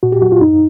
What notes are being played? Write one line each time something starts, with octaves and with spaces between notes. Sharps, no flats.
A#2 F#4
G4
F#3 F#4
F4
F#2 D#4